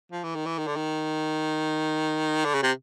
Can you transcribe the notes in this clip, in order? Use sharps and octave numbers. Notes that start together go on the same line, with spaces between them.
F3
E3
D#3
E3
D#3
D3
D#3
D3
C#3
C3